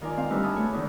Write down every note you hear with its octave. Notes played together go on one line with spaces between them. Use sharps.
D#3 F4 A#4 D5 G#5
C4 F5
D2 G3 D#4 B4 E6 F6
D#5 G#5 A5 B5 D#6
A3 F#4 A4 C#5
E2 G#2 D3 D#3 D#4